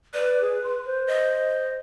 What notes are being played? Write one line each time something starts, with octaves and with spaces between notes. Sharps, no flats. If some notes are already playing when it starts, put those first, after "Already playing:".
B4 D5
G#4
C6
C5
D#5